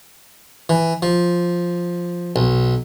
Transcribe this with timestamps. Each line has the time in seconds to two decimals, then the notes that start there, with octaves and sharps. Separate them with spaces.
0.69 E3
1.02 F3
2.36 B1